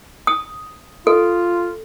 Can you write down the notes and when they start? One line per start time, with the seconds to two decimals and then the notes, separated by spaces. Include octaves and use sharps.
0.27 D#6
1.07 F4 A4